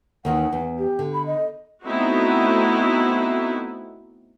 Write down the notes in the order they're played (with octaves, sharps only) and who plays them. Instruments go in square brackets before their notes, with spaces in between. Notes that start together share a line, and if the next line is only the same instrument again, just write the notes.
[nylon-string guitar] D#2 D#3 E3 [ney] F#5
[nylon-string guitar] E2
[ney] G4
[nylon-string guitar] D3
[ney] B5
D#5
[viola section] A3 B3 C4 D#4 E4 F#4